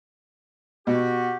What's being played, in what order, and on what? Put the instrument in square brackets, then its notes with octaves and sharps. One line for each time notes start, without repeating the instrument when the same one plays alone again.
[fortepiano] B2 [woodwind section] F#4 G4